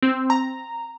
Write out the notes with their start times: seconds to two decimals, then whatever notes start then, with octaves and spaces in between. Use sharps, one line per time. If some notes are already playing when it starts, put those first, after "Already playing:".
0.03 C4
0.30 A#5